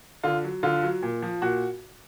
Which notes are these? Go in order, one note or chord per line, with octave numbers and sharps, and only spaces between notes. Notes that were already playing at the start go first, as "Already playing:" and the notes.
D3 F4
F#3
D3 F4
F#3
A#2
F3
A#2 F#4